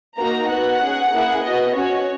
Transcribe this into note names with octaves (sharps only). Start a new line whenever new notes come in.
A#3 D#4 F#4 A#5
B3 F#4 F#5
C#4 G#4
A#3 E4 G#4
B3 F#4 D#5
C#4 F#4 C#5